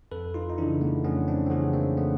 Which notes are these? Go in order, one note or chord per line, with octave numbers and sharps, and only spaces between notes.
F2 A4 B4
D#4 F4
D#4
C#3 E3 D4 E4
A3 B3
F2 B3 C#4
C4 D4
C4
C#3 E3 B3 C#4
A#3 C4
A3 B3